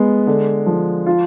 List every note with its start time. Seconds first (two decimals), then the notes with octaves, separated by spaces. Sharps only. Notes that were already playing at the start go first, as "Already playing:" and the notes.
Already playing: G#3 B3
0.27 D3
0.66 F3
1.06 F4